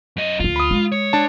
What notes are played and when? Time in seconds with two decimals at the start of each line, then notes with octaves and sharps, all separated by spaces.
0.17 F#2 D#5
0.40 D2 F3 F4
0.56 B5 D#6
0.71 G#3
0.92 C#5
1.13 D4 A5